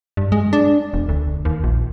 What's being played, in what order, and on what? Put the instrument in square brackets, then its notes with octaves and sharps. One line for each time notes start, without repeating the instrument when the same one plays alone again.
[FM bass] G2
G#3
D4
E1
D2
D#2
A#1